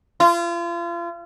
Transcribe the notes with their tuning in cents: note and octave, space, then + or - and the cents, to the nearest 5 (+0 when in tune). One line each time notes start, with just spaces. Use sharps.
F4 -35